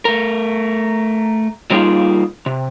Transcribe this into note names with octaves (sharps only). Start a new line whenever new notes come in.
A3 A#4
F#3 G3 A#3 D#4 F4 G#4
C3